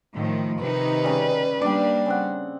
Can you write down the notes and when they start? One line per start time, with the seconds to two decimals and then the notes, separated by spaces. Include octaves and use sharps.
0.15 A2 D#3 F3
0.62 C3 D#3 D#4 B4
1.04 C#3 G3
1.61 G3 A#3 D4 D5 G5
2.06 C#3 C4 F#5